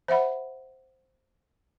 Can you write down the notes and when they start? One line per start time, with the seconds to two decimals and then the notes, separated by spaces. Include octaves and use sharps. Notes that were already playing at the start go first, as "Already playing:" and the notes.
0.08 C5 E5 F#5 B5